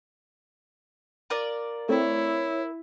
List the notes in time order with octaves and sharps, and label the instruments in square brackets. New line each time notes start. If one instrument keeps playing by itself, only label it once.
[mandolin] F4 A#4 D5
[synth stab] A3 C4 [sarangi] E4 [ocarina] C#5